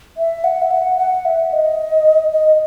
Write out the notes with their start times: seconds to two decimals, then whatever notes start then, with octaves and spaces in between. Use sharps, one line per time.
0.17 E5
0.44 F#5
0.62 E5
0.71 F#5
0.98 F#5
1.25 E5
1.53 D#5
2.32 D#5